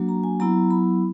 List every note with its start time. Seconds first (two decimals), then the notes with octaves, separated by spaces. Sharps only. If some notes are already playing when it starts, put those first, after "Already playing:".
Already playing: F#3 A#3 D4 F#4
0.09 A#5
0.24 G#5
0.40 F#3 B3 E4 A#5
0.71 B5